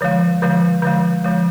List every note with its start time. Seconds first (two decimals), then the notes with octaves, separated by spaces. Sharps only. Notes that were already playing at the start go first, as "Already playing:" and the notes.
0.01 D3 F3 G#3
0.42 D3 F3 G#3
0.82 D3 F3 G#3
1.24 D3 F3 G#3